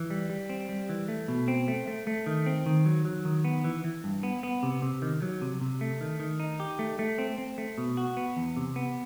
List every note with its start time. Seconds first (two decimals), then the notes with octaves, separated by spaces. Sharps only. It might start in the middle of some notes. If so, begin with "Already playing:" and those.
Already playing: E3
0.10 G3
0.30 G3
0.50 C4
0.69 G3
0.89 E3
1.08 A3
1.28 B2
1.48 C4
1.68 A3
1.88 A3
2.07 A3
2.26 D#3
2.46 C4
2.66 D#3
2.86 F#3
3.05 F#3
3.25 D#3
3.45 B3
3.64 E3
3.84 E3
4.04 G2
4.23 B3
4.43 B3
4.63 C3
4.82 C3
5.02 D#3
5.22 F#3
5.42 C3
5.61 C3
5.81 A3
6.01 D#3
6.20 D#3
6.40 D#4
6.60 G4
6.79 A3
6.99 A3
7.18 C4
7.38 C4
7.58 A3
7.78 B2
7.97 F#4
8.17 B3
8.37 E2
8.56 C3
8.76 B3